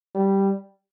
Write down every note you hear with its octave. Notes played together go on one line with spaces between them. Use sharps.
G3